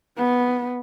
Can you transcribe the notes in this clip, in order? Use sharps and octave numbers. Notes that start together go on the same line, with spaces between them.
B3